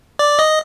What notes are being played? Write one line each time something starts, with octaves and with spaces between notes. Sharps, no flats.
D5
D#5